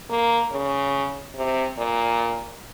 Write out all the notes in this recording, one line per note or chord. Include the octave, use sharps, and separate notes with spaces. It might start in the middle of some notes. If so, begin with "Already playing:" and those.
A#3
C#3
C3
A#2